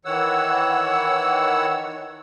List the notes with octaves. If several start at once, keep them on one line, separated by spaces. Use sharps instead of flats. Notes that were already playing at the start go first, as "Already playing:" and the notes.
D#3 E3 C#5 F#5 E6